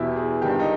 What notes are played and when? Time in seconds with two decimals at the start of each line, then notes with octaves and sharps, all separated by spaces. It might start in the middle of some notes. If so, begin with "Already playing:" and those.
Already playing: E2 B2 E4 G4
0.16 G#4
0.42 G2 D#3 G4
0.59 D#4